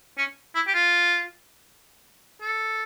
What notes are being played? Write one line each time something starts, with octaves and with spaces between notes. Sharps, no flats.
C#4
E4
G4
F4
A4